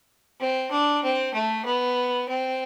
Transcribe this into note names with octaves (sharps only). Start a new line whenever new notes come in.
C4
D4
C4
A3
B3
C4